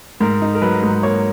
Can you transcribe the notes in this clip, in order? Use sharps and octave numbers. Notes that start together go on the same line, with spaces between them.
G#2 A#4
D#4
A#4
F#3 B4
G#2
A#3 C#5